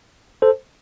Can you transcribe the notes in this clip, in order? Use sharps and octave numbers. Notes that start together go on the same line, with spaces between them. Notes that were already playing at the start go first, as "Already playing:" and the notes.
A4 C5